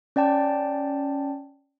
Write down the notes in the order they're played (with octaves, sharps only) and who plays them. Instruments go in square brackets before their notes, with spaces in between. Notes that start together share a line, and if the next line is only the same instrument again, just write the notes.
[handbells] C#4 D5 G5 A5